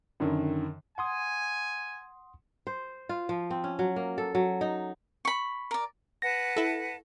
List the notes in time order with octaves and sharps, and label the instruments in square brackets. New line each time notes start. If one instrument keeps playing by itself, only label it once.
[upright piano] F#2 D3 D#3
[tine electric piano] F#5 C6 D#6 [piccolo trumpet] G#5
[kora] C5
F4
F3
C4
C#4
F#3
A#3
A4
F#3
D#4
[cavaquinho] B5 C#6
A#4 D5
[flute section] B4 F#5 A5 [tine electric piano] A#6
[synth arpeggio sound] E4 A4